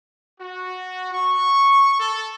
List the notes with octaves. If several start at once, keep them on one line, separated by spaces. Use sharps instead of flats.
F#4
C#6
A4